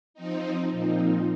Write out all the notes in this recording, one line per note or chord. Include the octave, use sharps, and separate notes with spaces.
F3 C4 D#4
A#2 F3 C4 D#4